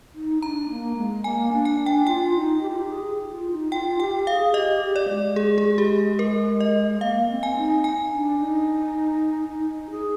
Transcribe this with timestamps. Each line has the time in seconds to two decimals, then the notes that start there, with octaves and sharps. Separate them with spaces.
0.14 D#4
0.42 D4 A#5
0.69 A#3
0.97 G#3
1.24 A#3 G#5
1.52 D4
1.65 G#5
1.79 D4
1.86 G5
2.06 F4 G5
2.35 D#4
2.62 G4
2.70 F4
2.77 G4
2.89 G#4
3.31 F4
3.51 D#4
3.72 F4 G5
3.99 G4 G5
4.15 G4
4.27 G#4 F5
4.54 G4 D#5
4.82 G#4
4.86 G4
4.96 D5
5.09 G#3
5.36 G#4
5.58 G#4
5.78 G4
6.19 A#4
6.60 D#5
7.01 A#3 F5
7.29 C4
7.43 G#5
7.57 D#4
7.84 G#5
8.11 D4
8.39 D#4
9.49 D#4
9.91 G#4